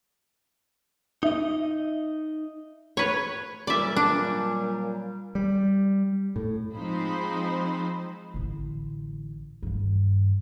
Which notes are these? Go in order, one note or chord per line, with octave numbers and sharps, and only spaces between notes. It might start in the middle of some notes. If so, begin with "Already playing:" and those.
D#4 D#5 E5
B4 C#5
A#2 F#3 G3 D5 E5
D4
G3
A2
F3 G#3 C4 D#4 C5 B5
A1 D3
G2 D#3